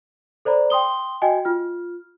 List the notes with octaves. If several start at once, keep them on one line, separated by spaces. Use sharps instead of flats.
A4 C5 D5 A#5 B5
G5 C6 D#6 G7
F#4 D#5 G5 G#5
F4 F6